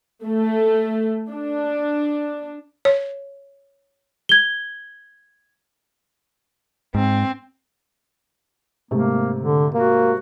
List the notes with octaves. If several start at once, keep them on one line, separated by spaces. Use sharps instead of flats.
A3
D4
C#5
G#6 G7
G#2 C4
G#2 C3 A3 A#3
D3
A#3 F#4